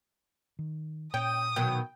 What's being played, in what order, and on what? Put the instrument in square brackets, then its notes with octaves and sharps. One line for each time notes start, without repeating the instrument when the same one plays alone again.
[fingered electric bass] D#3
[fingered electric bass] A#2 [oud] C#4 [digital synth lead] G5 [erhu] D#6
[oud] B2 D#3 F#3 [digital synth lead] G5